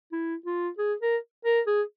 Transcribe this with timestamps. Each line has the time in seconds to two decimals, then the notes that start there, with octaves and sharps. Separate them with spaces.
0.12 E4
0.46 F4
0.78 G#4
1.01 A#4
1.45 A#4
1.67 G#4